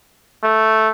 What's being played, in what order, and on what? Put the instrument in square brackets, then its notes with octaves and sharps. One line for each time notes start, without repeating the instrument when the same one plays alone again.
[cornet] A3